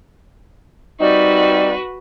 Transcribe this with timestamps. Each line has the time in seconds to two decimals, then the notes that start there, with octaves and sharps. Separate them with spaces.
1.01 G3 C4 D#4 F#4 B4 D5